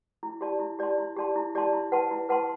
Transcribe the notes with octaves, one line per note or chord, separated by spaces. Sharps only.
E4
G4 D5 A5 C6
E4
G4 D5 A5 C6
E4
G4 D5 A5 C6
E4
G4 D5 A5 C6
E4
B4 F#5 A5 C6
E4
B4 F#5 A5 C6